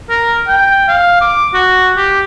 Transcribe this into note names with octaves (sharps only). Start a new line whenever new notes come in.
A#4
G5
F5
D6
F#4
G4